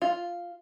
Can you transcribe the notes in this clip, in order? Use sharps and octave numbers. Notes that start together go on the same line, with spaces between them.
F4